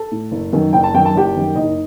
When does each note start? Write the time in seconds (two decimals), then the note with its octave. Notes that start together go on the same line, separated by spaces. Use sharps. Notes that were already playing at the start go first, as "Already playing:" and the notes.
Already playing: A4 A5
0.11 A2
0.31 F#1
0.53 F#2 D#3
0.73 F#1 G5
0.83 A5
0.94 F#2 D#3 G5
1.06 A5
1.15 F#1 G4 G5
1.35 F#2 D#3
1.55 F#1 D#4 D#5